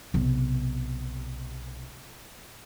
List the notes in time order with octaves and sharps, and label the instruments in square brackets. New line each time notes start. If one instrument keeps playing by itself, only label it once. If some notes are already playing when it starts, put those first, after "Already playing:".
[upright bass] B1 C3